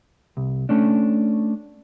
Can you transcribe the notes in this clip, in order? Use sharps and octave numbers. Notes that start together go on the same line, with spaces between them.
C2
A3 C#4 D4